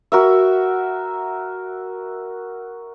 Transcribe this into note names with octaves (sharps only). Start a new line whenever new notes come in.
F#4 A#4 E5